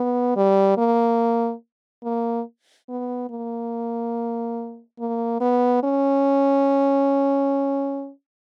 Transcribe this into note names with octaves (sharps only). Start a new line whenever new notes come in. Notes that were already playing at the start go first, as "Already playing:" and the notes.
Already playing: B3
G3
A#3
A#3
B3
A#3
A#3
B3
C#4